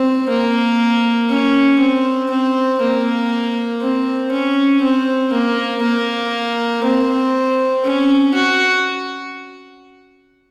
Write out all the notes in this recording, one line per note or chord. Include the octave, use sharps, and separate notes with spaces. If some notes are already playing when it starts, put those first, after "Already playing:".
Already playing: C4
A#3
C#4
C4
C4
A#3
C4
C#4
C4
A#3
A#3
C4
C#4
F#4